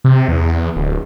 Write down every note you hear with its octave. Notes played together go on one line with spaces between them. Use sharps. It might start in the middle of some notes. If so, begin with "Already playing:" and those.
C3
E2
D1